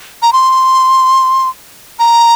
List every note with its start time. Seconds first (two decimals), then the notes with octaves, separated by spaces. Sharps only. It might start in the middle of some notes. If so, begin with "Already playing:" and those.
0.22 A#5
0.33 C6
1.99 A#5